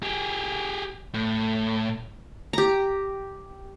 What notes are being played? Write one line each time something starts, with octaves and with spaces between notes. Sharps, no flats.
G4 G#4
A2
G4 A#5